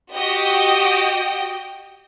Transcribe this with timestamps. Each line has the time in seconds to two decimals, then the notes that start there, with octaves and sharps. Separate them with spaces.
0.14 F#4 G4 D#5 G5